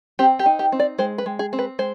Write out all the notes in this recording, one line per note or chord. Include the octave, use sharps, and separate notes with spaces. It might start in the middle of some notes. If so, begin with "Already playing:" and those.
C4 G4
G4
D#4
G4
C4
D5
G#3 C5
B4
G#3
G#4
C4
B4
G#3 C5